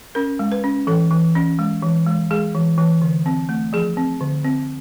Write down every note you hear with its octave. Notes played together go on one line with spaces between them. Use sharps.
C#4 A#4
G#3
B4
C#4
E3 A4
E3
C#4
G#3
E3
G#3
G#3 G#4
E3
E3
D3
C4
A3
F3 G#4
C4
D3
C4